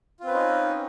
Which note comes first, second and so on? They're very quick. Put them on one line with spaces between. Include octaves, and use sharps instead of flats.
F4 C4 B4 C#4 D#4